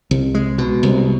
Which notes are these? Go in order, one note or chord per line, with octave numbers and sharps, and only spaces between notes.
C2
G#3
B2
C2